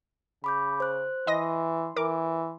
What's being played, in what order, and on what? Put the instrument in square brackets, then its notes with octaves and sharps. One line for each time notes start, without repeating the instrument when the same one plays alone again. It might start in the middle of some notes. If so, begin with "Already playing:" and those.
[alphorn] C#3 [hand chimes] B5 D6 G6
[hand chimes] C5 F#6
[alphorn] E3 [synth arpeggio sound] D#5 D#6 A#6 [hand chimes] C6
[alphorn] E3 [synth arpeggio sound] A#4 D6